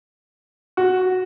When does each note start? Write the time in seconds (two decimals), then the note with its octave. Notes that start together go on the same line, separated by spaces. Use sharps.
0.77 F#4